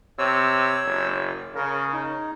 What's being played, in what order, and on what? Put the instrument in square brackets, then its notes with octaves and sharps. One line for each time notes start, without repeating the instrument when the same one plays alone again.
[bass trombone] C3 [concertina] C#5 E6
[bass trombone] F#1
[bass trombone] C#3 [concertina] A#4
[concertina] D#4